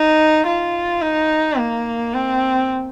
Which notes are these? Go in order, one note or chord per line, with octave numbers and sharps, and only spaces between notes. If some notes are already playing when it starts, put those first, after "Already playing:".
Already playing: D#4
F4
D#4
A#3
C4